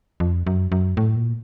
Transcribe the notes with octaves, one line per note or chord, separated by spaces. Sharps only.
F2
F#2
F#2
A2
A#2